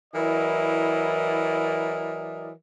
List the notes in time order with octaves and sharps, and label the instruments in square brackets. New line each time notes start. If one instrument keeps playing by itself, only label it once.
[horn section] E3 F#3 E4 A#4 D5 D#5